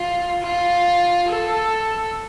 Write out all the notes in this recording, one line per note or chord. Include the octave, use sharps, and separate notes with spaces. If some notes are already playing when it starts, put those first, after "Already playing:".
Already playing: F4
F4
A4